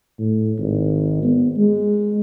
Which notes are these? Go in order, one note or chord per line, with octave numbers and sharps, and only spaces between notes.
A2
G#1
B3
G#3